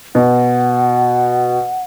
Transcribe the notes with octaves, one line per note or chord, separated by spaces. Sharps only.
B2 F#5